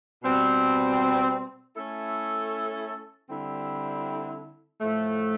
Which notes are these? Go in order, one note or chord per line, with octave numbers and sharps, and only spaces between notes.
B2 G3 C4
A3 C#4 E4 A4
D3 G3 C4 E4
A2 F3 A3